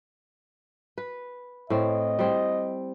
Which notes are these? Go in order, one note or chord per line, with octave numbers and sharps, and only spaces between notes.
B4
A2 C4 D#5
G3 C4